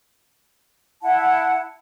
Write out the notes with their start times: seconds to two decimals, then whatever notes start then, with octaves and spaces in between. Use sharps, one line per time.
1.01 E4 F#5 A5